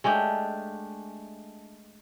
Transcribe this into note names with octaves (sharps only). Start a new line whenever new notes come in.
G#3 A3 D4 G4